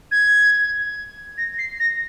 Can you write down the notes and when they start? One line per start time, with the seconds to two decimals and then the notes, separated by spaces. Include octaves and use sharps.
0.11 G#6
1.38 A#6
1.58 C7
1.80 A#6